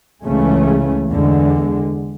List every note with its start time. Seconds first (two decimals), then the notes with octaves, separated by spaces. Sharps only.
0.24 C#2 C#3 E3 A3 C#4
1.09 E2 D3 G#3